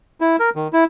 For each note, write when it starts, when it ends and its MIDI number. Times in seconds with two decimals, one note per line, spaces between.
0.21 0.36 64
0.40 0.50 70
0.55 0.68 51
0.73 0.84 64